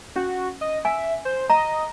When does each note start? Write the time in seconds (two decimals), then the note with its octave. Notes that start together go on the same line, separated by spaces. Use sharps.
0.16 C#4 F#4
0.61 D#5
0.85 E5 G#5
1.25 C5
1.50 D#5 A#5